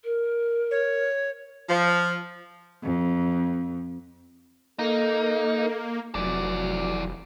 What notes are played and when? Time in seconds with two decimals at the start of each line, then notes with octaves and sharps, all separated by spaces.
0.04 A#4
0.71 C#5
1.69 F3
2.83 F2
4.79 A#3 D#4 A4
6.15 F1 E3 F#3 D5